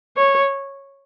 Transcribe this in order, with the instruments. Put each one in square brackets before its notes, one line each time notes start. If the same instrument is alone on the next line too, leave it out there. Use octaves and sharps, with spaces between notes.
[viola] C#5